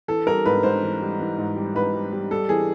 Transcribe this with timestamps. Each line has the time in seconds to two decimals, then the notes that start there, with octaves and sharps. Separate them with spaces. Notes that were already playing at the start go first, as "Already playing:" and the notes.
0.08 E3 A4
0.26 G3 A#4
0.46 G#2 B4
0.63 G#2 C5
0.83 E3
1.01 G3
1.20 E3
1.38 G#2
1.56 G3
1.75 G#2 B4
1.94 G3
2.12 G3
2.31 G3 A4
2.49 E3 G#4